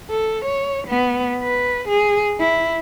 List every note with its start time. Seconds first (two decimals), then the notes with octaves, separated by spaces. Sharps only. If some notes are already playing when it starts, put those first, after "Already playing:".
0.11 A4
0.45 C#5
0.88 B3
1.44 B4
1.89 G#4
2.40 E4